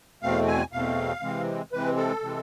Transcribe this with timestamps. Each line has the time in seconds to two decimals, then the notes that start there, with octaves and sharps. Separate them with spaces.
0.22 E2 B2 A3 C4 F5
0.47 G#5
0.73 E2 B2 A3 C4 F5
1.22 C3 E3 G#3 C4
1.72 C3 E3 G#3 C4 B4
1.97 A4
2.21 C3 E3 G#3 C4